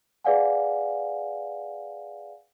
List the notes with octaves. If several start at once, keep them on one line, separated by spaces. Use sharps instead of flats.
G#4 B4 D5 F5 F#5 G#5